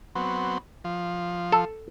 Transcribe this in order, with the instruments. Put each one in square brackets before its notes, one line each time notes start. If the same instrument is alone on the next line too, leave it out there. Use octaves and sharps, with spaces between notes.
[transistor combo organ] F#3 B3 C4
F3
[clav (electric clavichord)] A4